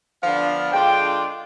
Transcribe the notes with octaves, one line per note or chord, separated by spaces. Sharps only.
D3 F3 B3 D4 F5
D3 G#3 D4 F4 G5